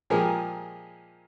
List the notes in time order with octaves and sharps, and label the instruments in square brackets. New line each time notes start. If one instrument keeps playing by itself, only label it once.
[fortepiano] A#2 F3 G#3 G4 G#4 A#4